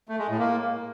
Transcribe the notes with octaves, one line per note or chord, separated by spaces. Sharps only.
A3
G#3
A2
A#3